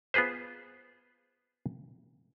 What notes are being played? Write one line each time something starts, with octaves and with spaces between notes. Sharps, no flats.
B3 F4 G#4 B4 C5